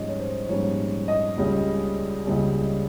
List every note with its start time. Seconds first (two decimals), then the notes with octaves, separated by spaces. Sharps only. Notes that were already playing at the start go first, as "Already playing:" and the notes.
Already playing: A#1 G#2 G3 C#4 D#5
0.09 C#5
0.19 C5
0.49 A#1 G#2 G3 C#4 C#5
1.08 D#5
1.38 C#2 C#3 G3 C#4
2.26 C#2 C#3 G3 C#4